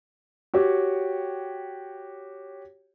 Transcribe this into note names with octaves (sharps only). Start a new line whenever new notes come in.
F#4 G4 C#5